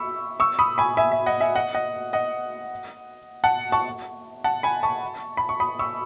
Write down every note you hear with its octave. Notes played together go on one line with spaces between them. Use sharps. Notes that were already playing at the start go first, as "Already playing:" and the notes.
Already playing: B5 C#6 E6
C#6 E6
B5 D#6
G#5 B5
E5 G#5
E5
D#5 F#5
E5 G#5
D#5 F#5
D#5 F#5
D#5 F#5
F#5 A5
A5 C#6
F#5 A5
G#5 B5
A5 C#6
B5
C#6
B5 D#6
C#6 E6